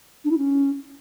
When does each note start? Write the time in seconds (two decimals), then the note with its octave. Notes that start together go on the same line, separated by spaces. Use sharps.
0.24 D4
0.31 E4
0.37 C#4